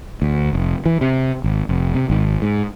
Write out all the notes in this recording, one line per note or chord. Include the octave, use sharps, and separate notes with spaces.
D2
F1
E3
C3
G#1
F1
C3
G#1
G#2